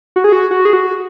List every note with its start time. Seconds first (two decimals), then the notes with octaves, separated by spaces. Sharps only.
0.16 F#4
0.24 G#4
0.32 F#4
0.51 F#4
0.65 G#4
0.73 F#4